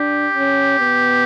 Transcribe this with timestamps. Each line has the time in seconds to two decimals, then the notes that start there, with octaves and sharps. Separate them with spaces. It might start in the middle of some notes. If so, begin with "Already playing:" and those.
Already playing: D4 G4
0.34 C#4
0.79 B3